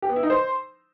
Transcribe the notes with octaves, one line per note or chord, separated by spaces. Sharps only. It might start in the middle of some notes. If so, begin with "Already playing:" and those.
G4
B3
E4
D#4
C5